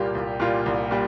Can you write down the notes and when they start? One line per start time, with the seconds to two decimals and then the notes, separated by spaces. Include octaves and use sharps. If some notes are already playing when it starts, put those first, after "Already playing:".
Already playing: C2 A#2 G3 A#3 F4 G4
0.15 C2
0.40 A#2 G3 A#3 F4
0.66 C2
0.91 A#2 G3